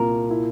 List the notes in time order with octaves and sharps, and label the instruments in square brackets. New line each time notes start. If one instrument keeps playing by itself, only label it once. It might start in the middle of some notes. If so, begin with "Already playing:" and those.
Already playing: [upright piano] C2 A#2 [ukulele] A#4
[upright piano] E4